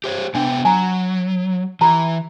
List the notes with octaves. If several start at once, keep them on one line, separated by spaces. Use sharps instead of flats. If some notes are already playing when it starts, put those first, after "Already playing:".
G4 C5 C#5
C3 B3 D4 G5
F#3 G#5 A#5
E3 G4 A#5 B5